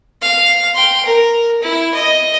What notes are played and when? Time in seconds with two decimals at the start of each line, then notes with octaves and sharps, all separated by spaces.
0.22 F5
0.74 G5 C6
1.06 A#4
1.62 E4
1.94 D#5